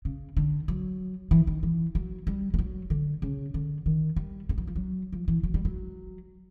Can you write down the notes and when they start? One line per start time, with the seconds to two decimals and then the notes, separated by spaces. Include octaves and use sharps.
0.05 C#3
0.37 D3
0.68 F#3
1.31 E3
1.47 D#3
1.63 E3
1.95 F#3
2.27 G3
2.54 G3
2.59 F#3
2.90 D3
3.22 C#3
3.54 D3
3.86 D#3
4.16 G3
4.49 G3
4.58 F#3
4.67 F3
4.76 F#3
5.13 F3
5.28 E3
5.43 F#3
5.54 G3
5.65 F#3